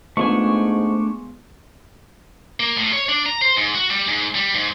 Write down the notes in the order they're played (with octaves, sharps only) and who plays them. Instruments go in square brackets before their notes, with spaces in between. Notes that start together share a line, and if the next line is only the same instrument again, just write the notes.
[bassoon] G#2 [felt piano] G#3 B3 F4 [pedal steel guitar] A3 D4 G#5 [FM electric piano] C#6
[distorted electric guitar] A#3
A2
C#5
D4
A#5
C5
G#2
F#4
G3
G#2
G3
G#2